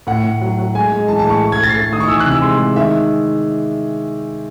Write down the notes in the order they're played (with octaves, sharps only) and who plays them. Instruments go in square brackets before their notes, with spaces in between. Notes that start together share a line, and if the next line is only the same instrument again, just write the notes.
[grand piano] A2 F#5
A2
F#3
F#3
G#3 G#5
G#3
E3 A5
A5
A2
C#6
A3
G#6
A3 A6
C7
A3 A6
D#3 D#6
C#6
E3 E6
F#6
C3
E6
G#3 C6
G#3
D#3 E5